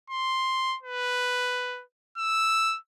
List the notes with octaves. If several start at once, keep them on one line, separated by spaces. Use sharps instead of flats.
C6
B4
E6